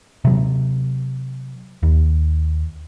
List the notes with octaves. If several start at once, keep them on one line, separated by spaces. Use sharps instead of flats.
C3 F#3
D#2